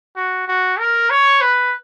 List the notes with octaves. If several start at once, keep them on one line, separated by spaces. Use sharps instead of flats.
F#4
F#4
A#4
C#5
B4